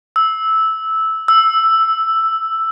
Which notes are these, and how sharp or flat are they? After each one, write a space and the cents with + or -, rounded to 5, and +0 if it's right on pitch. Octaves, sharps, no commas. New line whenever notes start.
E6 -10
E6 +5